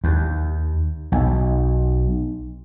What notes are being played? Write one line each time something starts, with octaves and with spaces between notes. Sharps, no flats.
D#2
B1